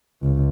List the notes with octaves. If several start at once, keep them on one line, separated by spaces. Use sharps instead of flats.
C#2